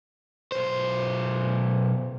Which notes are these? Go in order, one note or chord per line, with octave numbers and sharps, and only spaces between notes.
B1 C5